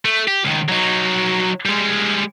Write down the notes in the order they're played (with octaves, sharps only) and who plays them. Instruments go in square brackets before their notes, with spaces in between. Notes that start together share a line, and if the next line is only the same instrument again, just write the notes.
[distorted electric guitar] A3
G4
C#2 D#3
F#3 D#4
G3 G#3